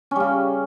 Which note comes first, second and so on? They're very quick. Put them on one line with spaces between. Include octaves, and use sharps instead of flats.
C#4 G3 C#3